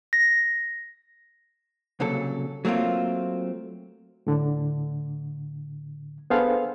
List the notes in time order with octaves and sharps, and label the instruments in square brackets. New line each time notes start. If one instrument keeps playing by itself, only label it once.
[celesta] A#6
[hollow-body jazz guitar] C2 A#2 C#3 F#3 A4
F#3 A3 A#3 C4 F4
[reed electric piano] A2 D3
B3 D4 G#4 A4 C5 F5